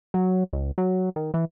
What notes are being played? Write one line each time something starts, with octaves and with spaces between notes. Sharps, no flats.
F#3
C#2
F#3
D#3
E3